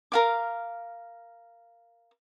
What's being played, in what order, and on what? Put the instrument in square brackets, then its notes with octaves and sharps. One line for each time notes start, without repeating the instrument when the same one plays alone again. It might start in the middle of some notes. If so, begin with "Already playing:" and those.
[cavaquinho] A#4 F5 D6